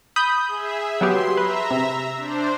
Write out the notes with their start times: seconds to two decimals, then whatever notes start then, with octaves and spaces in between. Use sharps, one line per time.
0.16 B5 D#6 G6
0.48 G#4 E5
1.01 F#3 B3 G4 C6
1.37 B4 E5 A#5
1.71 C3
2.17 D4 C5